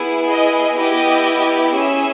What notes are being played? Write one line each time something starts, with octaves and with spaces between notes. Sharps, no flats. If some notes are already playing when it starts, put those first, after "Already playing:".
Already playing: B3 E4 G#4
D#5
B3 E4 G4 D#5
C#4 G#4 E5